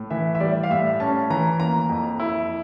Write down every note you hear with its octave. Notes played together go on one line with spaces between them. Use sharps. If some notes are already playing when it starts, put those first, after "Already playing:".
Already playing: A2
E3 E5
E5
G3 D5
F5
A2 E5
C#4 A5
E3 A#5
A#3 A#5
F2
E4